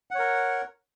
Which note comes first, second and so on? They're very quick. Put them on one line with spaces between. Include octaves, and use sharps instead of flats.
F#5 C#5 A#4